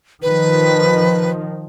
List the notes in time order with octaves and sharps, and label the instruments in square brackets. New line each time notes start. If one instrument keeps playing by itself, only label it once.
[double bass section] D#3 F3 [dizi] B4